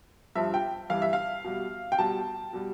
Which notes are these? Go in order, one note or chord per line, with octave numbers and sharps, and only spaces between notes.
G2 F3 E5
G5
G2 E3 G3 F5
E5
F5
B2 G3
G5
B2 G3 A5
B2 G3